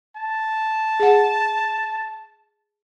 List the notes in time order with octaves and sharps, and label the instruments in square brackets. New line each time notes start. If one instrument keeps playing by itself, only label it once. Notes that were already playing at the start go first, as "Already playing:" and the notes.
[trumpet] A5
[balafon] G#4 F#5